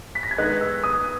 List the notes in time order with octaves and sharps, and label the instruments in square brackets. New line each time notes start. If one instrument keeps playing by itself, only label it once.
[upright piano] B6
A#6
G#6
[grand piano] D#3 G#3 B3 D#4 [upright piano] F#6
[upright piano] E6
D#6